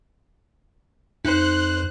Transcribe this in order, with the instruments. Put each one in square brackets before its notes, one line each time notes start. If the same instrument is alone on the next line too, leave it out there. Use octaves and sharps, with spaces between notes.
[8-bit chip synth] F2 [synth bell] D#4 [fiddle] C5 [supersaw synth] F#6